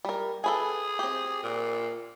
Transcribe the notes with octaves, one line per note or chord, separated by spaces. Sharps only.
G3 A#4
G#4 A4 B4 G#5
C4 G4
A#2